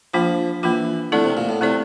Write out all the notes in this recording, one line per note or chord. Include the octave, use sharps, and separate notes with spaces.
F3 A#3 D4 F4
E3 A#3 D4 F4
D3 A3 C4 E4 A4 D5
C3
A#2
A2
C3 A3 C4 E4 A4 D5